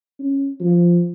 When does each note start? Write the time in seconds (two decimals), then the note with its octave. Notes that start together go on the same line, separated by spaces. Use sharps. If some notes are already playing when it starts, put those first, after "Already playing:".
0.19 C#4
0.60 F3